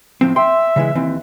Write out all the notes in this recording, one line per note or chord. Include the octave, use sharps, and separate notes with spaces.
A2 F3 C4
E5 G5 C6
C#3 E3 G#3
D#2 E3 C4